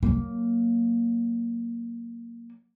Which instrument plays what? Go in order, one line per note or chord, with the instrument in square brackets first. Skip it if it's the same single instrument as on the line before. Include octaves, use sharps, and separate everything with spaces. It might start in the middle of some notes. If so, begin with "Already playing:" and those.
[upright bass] F#3 A#3